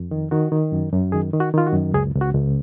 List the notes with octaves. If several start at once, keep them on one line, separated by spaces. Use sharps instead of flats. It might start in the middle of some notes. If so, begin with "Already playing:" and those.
Already playing: F2
D#3
D#3 F#4
D#3
F#2
F#2
D#3 G#4
D#3
F#4
D#3 F4
F#4
F#2
C#2 G#4
C#2
F#4
C#2